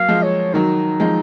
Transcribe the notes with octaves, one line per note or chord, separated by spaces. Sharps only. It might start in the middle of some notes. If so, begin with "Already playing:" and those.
Already playing: F#3 A#3 F5
F3 G#3
C#5
D#3 F#3 D#4
F3 G#3